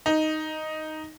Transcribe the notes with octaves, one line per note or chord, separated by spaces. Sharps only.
D#4